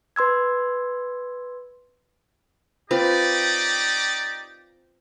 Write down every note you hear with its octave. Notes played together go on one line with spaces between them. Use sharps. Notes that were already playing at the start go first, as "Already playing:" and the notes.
B4 C6 E6 G#6
C4 D#4 F4 G4 B4 D5